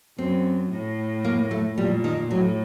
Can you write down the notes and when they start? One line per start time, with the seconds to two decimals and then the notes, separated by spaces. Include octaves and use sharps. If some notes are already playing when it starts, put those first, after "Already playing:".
0.18 F#2 C4
0.71 A2
1.24 A#3
1.51 A3
1.78 A#2 G3
2.04 D#3
2.30 A2 F#3